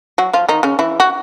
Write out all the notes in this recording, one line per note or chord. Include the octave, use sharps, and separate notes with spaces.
F#3 F#4
F3 F4
D#3 D#4
C#3 C#4
E3 E4
F#4